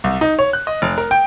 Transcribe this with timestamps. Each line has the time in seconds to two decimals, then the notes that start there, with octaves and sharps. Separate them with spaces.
0.04 C2
0.21 D#4
0.39 C#5
0.53 F#6
0.67 D#5
0.82 F1
0.98 A#4
1.11 G5